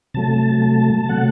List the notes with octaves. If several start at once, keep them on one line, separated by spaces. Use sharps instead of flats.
C3 F#3 A3 A5
A5
C3 F#3 A3 F#5